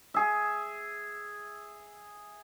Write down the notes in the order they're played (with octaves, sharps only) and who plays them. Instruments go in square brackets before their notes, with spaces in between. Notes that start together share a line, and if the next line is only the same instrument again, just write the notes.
[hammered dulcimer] G#4 E5